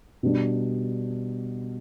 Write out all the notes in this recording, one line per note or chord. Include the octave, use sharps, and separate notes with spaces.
B2 G3 D4